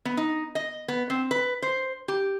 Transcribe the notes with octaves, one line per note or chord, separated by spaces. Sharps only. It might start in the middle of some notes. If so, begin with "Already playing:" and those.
B3
D#4
D#5
B3
C4
B4
C5
G4